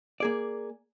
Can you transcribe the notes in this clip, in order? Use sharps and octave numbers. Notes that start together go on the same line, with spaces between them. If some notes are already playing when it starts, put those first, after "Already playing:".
A#3 G#4 D5